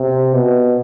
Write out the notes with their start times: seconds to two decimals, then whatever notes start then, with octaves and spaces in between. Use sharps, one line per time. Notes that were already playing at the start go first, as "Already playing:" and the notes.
Already playing: C3
0.33 B2